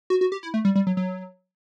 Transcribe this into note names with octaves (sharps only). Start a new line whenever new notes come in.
F#4
F#4
G4
E4
A3
G3
G3
F#3
F#3